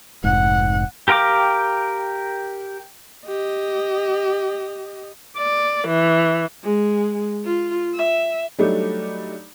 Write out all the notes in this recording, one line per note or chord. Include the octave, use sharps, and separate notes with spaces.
F1 G#2 F#5
G4 A#4 F5 G5 D6
G4 D#5
D5
E3
G#3
F4
E5
F#3 G3 A3 D4 D#4